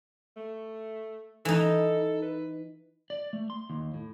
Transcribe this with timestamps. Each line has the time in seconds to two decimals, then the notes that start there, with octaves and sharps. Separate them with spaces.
0.37 A3
1.45 E3 D#4 A4
2.22 B4
3.10 D5
3.33 A3
3.50 C6
3.70 D#2
3.94 A2